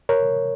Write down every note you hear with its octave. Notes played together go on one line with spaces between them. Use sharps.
A#4 C#5